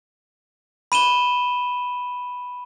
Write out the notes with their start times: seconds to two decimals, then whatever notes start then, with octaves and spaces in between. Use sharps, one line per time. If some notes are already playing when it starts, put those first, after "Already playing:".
0.92 B5 D#7 E7 G7